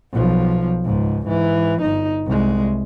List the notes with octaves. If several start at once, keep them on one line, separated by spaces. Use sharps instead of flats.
B1 F3
C#2 G#2
G#2 E3
G1 D#4
C2 G#3